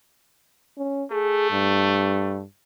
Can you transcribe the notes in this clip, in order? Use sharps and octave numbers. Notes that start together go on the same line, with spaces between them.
C#4
A3 G#4
G2